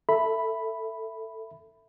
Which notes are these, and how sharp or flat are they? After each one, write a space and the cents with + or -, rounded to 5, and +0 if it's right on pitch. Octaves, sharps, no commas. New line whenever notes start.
A4 +15 E5 +0 B5 +0